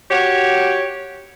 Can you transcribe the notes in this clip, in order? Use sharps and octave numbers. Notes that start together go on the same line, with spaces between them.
F#4 G4 C#5